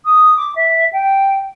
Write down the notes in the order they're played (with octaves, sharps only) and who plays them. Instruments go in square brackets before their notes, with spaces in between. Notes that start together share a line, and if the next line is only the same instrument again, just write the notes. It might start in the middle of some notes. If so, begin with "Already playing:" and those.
[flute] D#6
D6
E5
G5